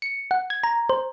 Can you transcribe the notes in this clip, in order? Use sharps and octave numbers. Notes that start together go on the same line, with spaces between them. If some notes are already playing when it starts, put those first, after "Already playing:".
C#7
F#5
G#6
A#5
C5